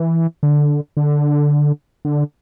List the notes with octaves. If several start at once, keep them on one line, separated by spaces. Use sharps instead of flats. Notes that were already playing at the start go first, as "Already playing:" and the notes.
Already playing: E3
D3
D3
D3